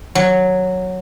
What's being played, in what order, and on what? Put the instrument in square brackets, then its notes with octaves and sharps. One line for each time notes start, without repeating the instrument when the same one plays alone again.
[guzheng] F#3